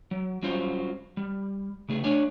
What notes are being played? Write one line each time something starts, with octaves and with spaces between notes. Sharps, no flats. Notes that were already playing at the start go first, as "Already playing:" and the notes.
F#3
F#3 G3 C#4 F4 C5
G3
C#3 A3 G#4
A3 D4 C#5 D5 G#5